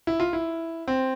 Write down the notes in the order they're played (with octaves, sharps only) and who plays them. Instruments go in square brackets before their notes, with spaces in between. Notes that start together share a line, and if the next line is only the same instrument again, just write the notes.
[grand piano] E4
F4
E4
C4